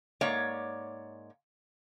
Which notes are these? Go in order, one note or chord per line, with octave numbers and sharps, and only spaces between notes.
G#2 A#3 C#5 D5